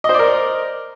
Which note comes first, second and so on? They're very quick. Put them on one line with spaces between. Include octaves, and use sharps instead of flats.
D#5 C5 D5 A#4